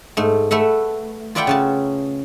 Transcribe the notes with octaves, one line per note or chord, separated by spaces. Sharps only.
G#2 A3
A3 B4 E5 F#5
F4 B4 D5 E5 F#5 G5
C#3 C#4 A5